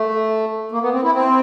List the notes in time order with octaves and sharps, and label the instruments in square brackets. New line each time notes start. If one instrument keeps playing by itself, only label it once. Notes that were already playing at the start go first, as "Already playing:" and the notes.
Already playing: [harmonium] A3
A#3
B3
C4
E4
C4